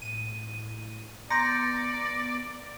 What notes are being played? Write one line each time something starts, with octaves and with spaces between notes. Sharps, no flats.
A2 D#7
B3 D5 A#5 C6 G6 A6 A#6 C#7